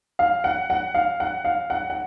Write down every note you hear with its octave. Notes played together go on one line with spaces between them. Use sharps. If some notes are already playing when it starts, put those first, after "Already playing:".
F5
F#5
F#5
F5
F#5
F5
F#5
F#5